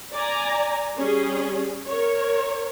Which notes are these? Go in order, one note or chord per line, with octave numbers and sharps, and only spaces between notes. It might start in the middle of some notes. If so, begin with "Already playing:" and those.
D5 G#5 A#5
G3 C#4 G#4
A#4 C#5